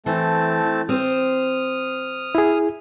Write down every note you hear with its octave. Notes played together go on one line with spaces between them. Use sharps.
E3 A3 C4 A5
C4 C5 D#6 F6
E4 G#4